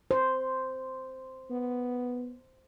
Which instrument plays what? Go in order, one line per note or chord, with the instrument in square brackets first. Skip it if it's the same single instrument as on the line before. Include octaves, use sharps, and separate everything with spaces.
[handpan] C5
[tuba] B3